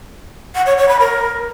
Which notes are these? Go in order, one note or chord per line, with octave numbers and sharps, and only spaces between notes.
F#5
C#5
C#5
B5
A#4